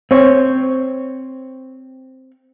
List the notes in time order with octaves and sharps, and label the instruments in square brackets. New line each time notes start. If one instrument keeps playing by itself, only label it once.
[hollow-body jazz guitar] C4 C#5